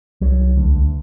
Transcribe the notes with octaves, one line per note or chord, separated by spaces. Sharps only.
C2 F#3
D2